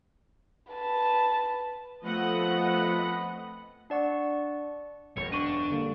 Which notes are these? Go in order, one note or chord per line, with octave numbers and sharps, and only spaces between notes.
B4 A5
F3 A3 B3 C4 D#5 F#5 B5
D4 D5 F#5 C#6
E1 F#2 C#5
D4 C#6 D#7
D3 G3 A#3